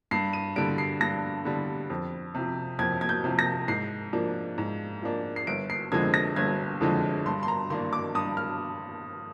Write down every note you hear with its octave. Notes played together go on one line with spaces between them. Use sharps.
G2 C7
D#7
D3 G3 D7
C7
G2 A#6
D3 G3
F2
C3 F3
F2 G#6
G#6
G6
C3 F3
A#6
G#2 C7
F3 A#3 D4
G#2
F3 A#3 D4
C7
G1 D7
C7
F2 D3 F3 G#3 G#6
A#6
G1 G#6
F2 D3 F3 G#3
G2 C6
C6
A#5
D#3 A#3 D4 C6
D6
G2 D#6
F6